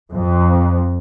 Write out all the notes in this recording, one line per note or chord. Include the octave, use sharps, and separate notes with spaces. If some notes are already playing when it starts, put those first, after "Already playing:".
F2